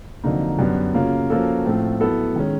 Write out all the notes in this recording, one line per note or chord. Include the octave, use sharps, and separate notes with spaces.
F2 D3 F#3 A#3 D#4
F#2 D3 G3 B3
C#3 F#3 A#3 C#4 F4
F3 A#3 C#4 F#4 A4
A2 F3 A3 C4 F4
F#3 B3 E4 A4
D#3 G#3 C#4